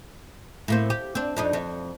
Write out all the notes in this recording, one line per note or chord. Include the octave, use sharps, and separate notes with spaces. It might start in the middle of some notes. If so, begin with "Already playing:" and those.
A2 A#3 C4
G4
C4 D4
F2 D4 D#4
F2